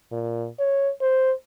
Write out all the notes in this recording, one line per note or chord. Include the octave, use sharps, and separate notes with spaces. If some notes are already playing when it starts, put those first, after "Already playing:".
A#2
C#5
C5